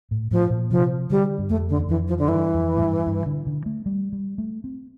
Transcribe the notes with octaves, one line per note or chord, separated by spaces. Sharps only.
A2
A2 F3
A#2
C3 F3
D3 G3
G2
F2 A3
D3
E2
F2 E3
F3
D3
G2 E3
F2
A2
G2
G2
D3
D3
A3
G3
G3
A3
C4